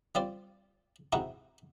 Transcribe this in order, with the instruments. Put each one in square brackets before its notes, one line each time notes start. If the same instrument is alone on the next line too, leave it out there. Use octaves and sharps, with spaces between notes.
[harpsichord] G3 C4 F4 D5
G#2 C3 D#4 E4 F#4